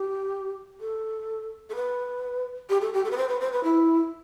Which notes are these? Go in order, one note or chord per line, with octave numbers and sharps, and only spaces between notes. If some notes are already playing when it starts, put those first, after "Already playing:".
Already playing: G4
A4
A4
B4
G4
A4
G4
A4
B4
C5
B4
C5
B4
E4